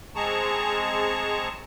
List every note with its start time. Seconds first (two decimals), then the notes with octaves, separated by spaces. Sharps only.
0.15 G#3 C4 G#4 A5 A#5 C#6